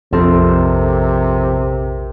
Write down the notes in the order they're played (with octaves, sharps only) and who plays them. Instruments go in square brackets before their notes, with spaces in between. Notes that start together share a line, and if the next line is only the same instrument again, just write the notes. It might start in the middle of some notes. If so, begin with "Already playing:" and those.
[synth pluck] A#1 [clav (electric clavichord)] F2 [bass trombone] C3 [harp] C4 A4 A#4